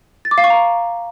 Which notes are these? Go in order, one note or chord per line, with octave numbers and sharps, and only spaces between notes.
A6
D6
F5
C#6
A#5